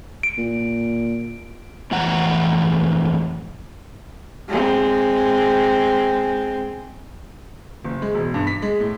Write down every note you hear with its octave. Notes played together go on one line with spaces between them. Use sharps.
D7
A#2
F2 A2 E3 F#5 A#5
G#3 C4
F#1
G#3
E1
G2
B6
G#3
A2